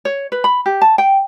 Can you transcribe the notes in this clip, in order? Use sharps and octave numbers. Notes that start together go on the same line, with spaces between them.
C#5
B4
B5
G4
A5
G5